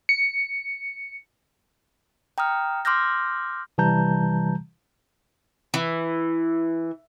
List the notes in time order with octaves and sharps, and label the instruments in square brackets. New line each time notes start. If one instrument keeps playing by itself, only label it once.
[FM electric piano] C#7
[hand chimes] G5 A#5 D#6 F6
C6 D6 E6 F6 G6 A#6
[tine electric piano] C3 E3 G3 A5 A#5 G6
[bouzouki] E3